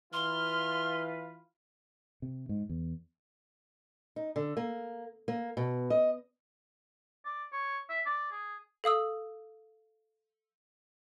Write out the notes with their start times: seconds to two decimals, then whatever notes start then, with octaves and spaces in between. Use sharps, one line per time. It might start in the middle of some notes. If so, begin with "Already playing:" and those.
0.13 E3 F4 B4 F5 C6 F6
2.22 C3
2.49 G#2
2.69 E2
4.16 D#4
4.36 D3
4.57 A#3
5.28 A#3
5.57 B2
5.90 D#5
7.25 D5
7.52 C#5
7.90 E5
8.06 D5
8.32 G#4
8.84 A4 F5 D#6 E6